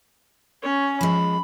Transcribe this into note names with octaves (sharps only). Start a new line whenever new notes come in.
C#4 C#5
F3 G#3 B5